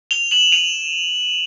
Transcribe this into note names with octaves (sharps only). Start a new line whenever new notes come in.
F7 G7
E7 F#7
D#7 F7